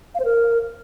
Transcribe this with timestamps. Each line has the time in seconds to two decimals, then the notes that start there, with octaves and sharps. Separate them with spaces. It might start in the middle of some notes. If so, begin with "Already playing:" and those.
0.15 F5
0.20 C5
0.25 A#4